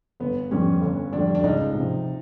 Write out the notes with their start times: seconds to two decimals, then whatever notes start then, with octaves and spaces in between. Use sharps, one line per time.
0.20 G1 B3
0.51 F2 D3 G3 C#4
0.81 G1
1.13 F2 D3 G3 D4
1.35 D4
1.43 C#2 D#4
1.74 C3 F3